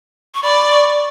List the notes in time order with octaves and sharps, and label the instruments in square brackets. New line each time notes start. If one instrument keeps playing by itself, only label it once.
[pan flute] C#6
[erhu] D5 [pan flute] B5
[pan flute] C#6